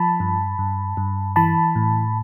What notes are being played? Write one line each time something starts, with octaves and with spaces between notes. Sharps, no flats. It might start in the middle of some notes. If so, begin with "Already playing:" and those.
Already playing: F3 A5 B5
G2
G2
G2
E3 A5 B5
A2